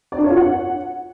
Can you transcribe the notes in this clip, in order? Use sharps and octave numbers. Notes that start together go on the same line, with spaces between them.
D5
D4
C#5
F4
F#5